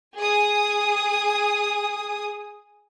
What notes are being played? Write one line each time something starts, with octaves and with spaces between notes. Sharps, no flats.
G#4 G#5 D#6